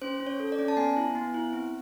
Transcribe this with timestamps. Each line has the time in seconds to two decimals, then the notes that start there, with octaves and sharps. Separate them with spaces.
0.02 C#4 C5
0.20 C#4
0.27 C#5
0.40 A4
0.52 D5
0.59 C#4
0.68 A5
0.77 B3 G#5
0.96 E4
1.15 B3
1.34 E4
1.53 C4